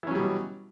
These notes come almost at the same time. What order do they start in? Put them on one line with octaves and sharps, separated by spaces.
E3 C#4 F#3 G3 B2